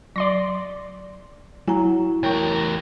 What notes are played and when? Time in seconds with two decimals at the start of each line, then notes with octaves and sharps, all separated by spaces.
0.16 F#3 D5 C6 A#6
1.68 F#3 E4 G#5 A#5
2.23 E2 A#4 C#5 G5 C#6